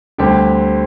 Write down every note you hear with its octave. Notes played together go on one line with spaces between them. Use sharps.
D2 D3 G3 C4 G4